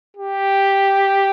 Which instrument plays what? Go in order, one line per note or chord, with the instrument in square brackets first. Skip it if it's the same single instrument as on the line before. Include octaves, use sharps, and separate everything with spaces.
[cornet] G4